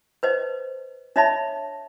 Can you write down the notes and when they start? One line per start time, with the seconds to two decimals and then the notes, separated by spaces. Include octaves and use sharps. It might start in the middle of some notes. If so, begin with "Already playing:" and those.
0.23 B4 C5 D#5
1.16 D4 C#5 D#5 E5 A5 B5